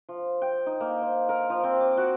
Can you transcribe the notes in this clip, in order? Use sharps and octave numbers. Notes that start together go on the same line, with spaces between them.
F3
G5
D#4
A#3
C5
A#4
F3
C4
D6
F#4